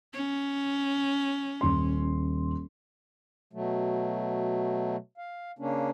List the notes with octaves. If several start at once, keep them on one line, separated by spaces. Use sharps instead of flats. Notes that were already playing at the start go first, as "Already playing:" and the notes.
C#4
D#1 C6
B2 F#3 A3
F5
C#3 A#3 C#4 D4